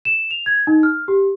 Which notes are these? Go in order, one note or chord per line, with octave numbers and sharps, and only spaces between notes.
E7
F7
G#6
D#4
F6
G4